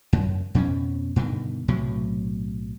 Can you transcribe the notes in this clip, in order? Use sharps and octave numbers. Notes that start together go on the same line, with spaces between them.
F#2
F2 B2 B3 C#4
G2 B2 D3 D#3
B1 A2 C3 F#3